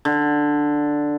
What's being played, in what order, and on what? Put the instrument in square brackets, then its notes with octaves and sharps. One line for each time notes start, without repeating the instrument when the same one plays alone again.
[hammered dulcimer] D3